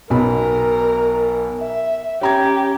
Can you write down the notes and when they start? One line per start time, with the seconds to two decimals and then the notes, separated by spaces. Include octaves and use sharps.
0.10 B1 B2 A#4 B5
1.60 E5
2.21 C#4 G4 A#5 G#6